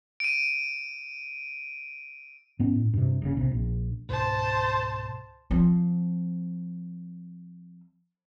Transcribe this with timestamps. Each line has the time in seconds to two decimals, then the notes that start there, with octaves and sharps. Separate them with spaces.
0.20 D7 D#7
2.59 G#2 B3 C#4
2.75 A2
2.94 G2 C3
3.22 F#1 A2 C#3
3.37 B1 C3
3.51 A#1
4.09 C#2 G#2 B2 C5 A5
5.51 F3 C4